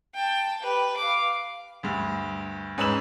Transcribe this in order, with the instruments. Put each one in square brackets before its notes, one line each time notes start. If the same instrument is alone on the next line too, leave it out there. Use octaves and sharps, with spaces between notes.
[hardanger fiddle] G5 A5
G4 B4
F5 D6
[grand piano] D2 G2
G#2 C#4 B4 E6 E7 F#7